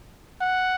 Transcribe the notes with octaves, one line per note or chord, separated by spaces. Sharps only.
F#5